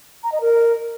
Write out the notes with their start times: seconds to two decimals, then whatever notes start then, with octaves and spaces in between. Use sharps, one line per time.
0.23 A#5
0.32 D#5
0.41 A#4